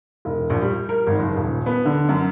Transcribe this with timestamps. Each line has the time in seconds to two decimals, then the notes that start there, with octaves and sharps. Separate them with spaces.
0.25 E1
0.50 A#1
0.62 G3
0.89 A#4
1.07 G#1
1.19 F#1
1.37 D#1
1.66 B3
1.85 D3
2.09 F#2